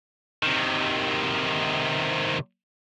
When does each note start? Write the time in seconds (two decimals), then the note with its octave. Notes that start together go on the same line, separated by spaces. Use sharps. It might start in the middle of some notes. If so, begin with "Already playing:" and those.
0.43 C3 D#3